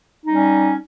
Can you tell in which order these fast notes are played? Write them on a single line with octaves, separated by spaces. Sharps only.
D#4 G3 C#4